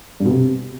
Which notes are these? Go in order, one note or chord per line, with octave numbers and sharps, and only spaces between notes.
G2
B2
C3